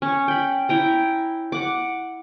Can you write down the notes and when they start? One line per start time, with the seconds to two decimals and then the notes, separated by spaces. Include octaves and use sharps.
0.02 C#4
0.28 G5 B5
0.69 E4 G5 A#5
1.52 F#5 D6